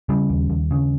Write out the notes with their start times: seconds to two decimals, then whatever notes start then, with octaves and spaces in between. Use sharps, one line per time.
0.09 C#3 G3
0.30 D#2
0.50 D#2
0.71 C#3